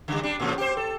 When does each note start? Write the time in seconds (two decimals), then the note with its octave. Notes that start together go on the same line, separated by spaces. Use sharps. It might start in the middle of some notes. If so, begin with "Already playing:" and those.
0.08 C#3 G3
0.23 G3 D4
0.40 A2 C#3 F3
0.58 G4 C5
0.77 A4